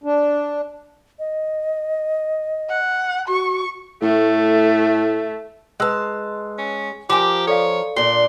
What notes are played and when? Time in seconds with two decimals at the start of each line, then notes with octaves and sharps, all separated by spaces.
0.04 D4
1.19 D#5
2.69 F#5
3.28 F#4 C#6
4.02 A2 A3
5.80 G#3 B4 A5 E6 F#6
6.58 C#4
7.10 F3 G4 A#4 G#5 D6
7.47 A4 C#5 D5 F5
7.96 A#2 D4 C6